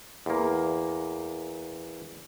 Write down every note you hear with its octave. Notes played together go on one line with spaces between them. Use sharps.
E2 A#3